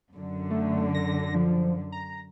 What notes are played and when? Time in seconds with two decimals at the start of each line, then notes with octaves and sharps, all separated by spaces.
0.13 F#2 D3
0.51 A3
0.94 A#6
1.35 F3
1.92 A#5